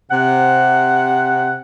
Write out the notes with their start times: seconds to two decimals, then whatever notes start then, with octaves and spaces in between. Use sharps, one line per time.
0.11 C3 F#5